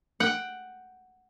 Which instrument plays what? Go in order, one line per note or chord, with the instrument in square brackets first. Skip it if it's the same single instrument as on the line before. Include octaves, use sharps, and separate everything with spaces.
[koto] F#5 G5